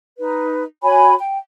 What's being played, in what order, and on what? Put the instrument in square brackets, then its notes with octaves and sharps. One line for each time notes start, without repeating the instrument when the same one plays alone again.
[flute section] D#4 B4
F#4 C#5 G#5 B5
G5